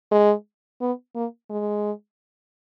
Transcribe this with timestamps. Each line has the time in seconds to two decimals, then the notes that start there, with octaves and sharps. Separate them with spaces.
0.11 G#3
0.81 B3
1.15 A#3
1.50 G#3